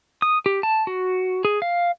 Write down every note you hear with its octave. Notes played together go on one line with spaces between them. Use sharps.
D#6
G4
A5
F#4
G#4
F5